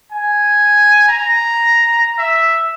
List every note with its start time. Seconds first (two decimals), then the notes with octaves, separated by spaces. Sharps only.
0.11 G#5
1.09 A#5
2.18 E5